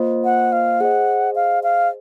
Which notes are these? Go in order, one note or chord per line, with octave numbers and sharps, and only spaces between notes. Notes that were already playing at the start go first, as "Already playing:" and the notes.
Already playing: A#3 F4 C5 D#5
F#5
F5
G#4 C5 D#5 F#5
F5
F5